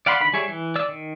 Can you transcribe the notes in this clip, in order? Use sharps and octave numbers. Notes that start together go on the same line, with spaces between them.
D5 F5 F#5 B5 C6
D3 D#3 B5
G3 G#4 C#5 E5
E3
D5 E6
D#3